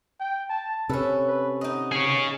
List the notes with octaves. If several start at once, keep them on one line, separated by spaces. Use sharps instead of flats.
G5
A5
C3 C#4 A4 B4
B4
B3 D#4 D#5
G#4 C#5